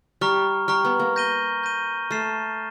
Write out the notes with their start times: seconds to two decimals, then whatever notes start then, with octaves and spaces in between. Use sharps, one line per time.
0.21 G3 A#5 C#6 F6
0.68 G3 A#5 C#6 F6
0.85 B3
1.00 A#3
1.16 G6 A#6 D#7 G7
1.63 G6 A#6 D#7 G7
2.11 A3 F6 A6 C7 E7